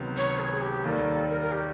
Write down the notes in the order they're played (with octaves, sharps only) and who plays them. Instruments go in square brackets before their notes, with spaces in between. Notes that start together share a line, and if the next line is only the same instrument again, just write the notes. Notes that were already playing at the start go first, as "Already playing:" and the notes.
Already playing: [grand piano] C#2 C3 D#3 F#3 B3
[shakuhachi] C#5
G#4
G#4
G4
[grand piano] D#2 D#3 G3 A#3 [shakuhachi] A4
[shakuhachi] A#4
A#4
G4